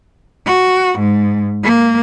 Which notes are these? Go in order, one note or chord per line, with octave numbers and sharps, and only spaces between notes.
F#4
G#2
A#3